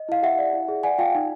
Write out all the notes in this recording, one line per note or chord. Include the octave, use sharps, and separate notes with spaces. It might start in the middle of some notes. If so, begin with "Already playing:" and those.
Already playing: D#5
E4 F5
G4 E5 F#5
D5
E4
G#4
D5 F#5 G#5
F4 F5 G5
D#4